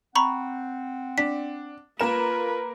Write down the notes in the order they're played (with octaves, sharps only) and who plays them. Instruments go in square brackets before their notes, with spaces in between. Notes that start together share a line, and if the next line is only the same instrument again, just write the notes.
[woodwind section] C4 F#5 [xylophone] A#5 B5 C#6
[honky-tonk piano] D4 [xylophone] B6
[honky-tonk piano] A#3 A#4 E7 [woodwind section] F4 [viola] B4